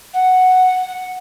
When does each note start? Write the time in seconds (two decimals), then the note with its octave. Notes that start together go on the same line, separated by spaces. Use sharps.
0.14 F#5